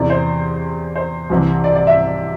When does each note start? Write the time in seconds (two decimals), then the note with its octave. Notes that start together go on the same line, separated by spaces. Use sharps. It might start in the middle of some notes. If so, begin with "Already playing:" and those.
Already playing: E2 C3 E3 D5
0.10 C5
0.96 C5
1.30 C2 C3 E3
1.64 D5
1.75 D5
1.87 E5